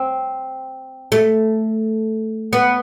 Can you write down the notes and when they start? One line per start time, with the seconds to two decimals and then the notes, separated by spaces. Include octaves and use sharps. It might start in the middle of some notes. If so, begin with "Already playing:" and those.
Already playing: C4
1.12 A3
2.53 B3